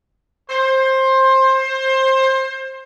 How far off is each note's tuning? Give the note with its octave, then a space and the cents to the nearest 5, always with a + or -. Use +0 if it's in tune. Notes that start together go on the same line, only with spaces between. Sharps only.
C5 +20